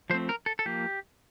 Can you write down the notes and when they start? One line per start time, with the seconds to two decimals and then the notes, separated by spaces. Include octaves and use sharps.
0.10 F3 A3 C4 C5
0.29 A#4
0.46 A4
0.59 A4
0.66 F3 A#3 G4